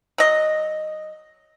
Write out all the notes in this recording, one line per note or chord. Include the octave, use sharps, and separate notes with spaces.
F#3 D#5